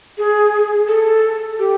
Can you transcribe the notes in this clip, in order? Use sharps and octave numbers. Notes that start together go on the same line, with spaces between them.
G#4
A4
G4